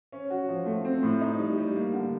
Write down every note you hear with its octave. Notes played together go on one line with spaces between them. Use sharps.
C#4
F#4
F3
A3
C4
A2
D#4
G3
G3
A#3
D3